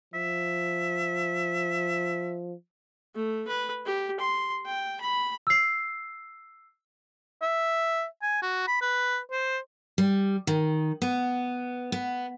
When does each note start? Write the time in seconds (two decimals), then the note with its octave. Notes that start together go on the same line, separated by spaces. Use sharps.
0.14 F3 E5
3.15 A3
3.47 B4
3.86 G4
4.20 C6
4.66 G5
5.00 B5
5.47 E6 C7
7.42 E5
8.22 G#5
8.42 F#4
8.68 B5
8.81 B4
9.31 C5
9.98 G3
10.47 D#3
11.02 B3
11.92 B3